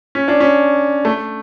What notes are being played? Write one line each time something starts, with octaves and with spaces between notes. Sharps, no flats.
C#4
D4
C#4
A3